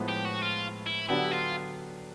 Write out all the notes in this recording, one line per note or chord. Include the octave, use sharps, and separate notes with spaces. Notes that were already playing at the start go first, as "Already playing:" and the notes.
Already playing: A2 F3 G#3 B3
G4
F#4
F4
E4
D3 F#3 B3 D4 E4 G4
F4